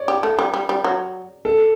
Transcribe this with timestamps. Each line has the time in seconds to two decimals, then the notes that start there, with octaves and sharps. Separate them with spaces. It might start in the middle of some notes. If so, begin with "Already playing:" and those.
Already playing: C#5 D5
0.08 G4
0.23 A3
0.39 G3
0.54 G3
0.69 G3
0.84 F#3
1.45 A4